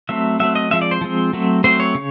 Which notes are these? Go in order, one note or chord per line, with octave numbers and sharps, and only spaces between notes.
F#3 A3 C4 E5
F#3 A3 C4 E5
D#5
F3 G#3 C4 E5
D5
C5
F3 G#3 C4
F#3 A3 C4
F#3 A3 C4 C5
C#5
C#3